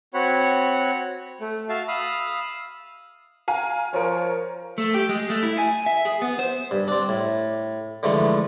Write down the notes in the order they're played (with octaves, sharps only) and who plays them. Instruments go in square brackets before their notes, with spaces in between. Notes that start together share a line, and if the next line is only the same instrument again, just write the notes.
[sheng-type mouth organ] C4 F#4 C#5 F#5 B5
A3
F#4 E5 F5 A5
F5 B5 D#6 E6
[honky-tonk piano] F5 G#5 A#5
[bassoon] F3 [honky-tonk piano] A#4 C#5
[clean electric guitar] A3
G4
G#3
A3
E4
G#5
E5
G#4
B3
C5
[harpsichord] G2
C4 D4
A2
D3 E3 F3 G#3 A3